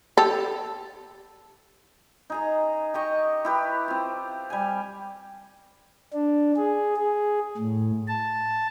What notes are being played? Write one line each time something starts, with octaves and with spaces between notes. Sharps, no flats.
G4 A4
D#4 G#4 A#5
G4 D#5 C#6
E4 G4 B4
C4 F4
G3 G#5
D4
G#4
G#4
A2
A5